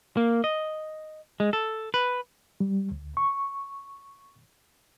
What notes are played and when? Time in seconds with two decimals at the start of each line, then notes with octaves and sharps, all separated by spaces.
0.17 A#3
0.44 D#5
1.40 G#3
1.53 A4
1.94 B4
2.60 G3
2.91 D2
3.17 C#6